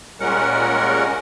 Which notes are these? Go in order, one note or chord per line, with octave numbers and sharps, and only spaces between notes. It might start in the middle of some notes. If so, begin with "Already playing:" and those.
A#2 G3 G#3 C#4 A#4 F#5